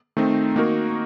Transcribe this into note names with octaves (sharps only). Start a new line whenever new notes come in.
D#3 A3 C4 D#4
D#3 A#3 D#4 F#4 A#4